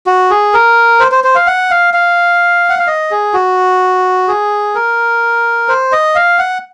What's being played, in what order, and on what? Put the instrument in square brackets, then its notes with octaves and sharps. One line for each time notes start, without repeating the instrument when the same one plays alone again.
[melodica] F#4
G#4
A#4
C5
C5
C5
F5
F#5
F5
F5
F#5
F5
D#5
G#4
F#4
G#4
A#4
C5
D#5
F5
F#5